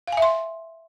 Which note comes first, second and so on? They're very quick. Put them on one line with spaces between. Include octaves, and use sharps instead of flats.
F5 G#5 E5 C6